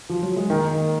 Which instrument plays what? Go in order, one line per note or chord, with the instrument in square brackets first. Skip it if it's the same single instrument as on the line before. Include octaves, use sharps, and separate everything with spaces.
[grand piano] F3
F#3
G#3
[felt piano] D#3 [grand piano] A#3
[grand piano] A#3